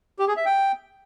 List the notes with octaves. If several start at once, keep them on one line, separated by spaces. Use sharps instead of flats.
G4
G#4
E5
G5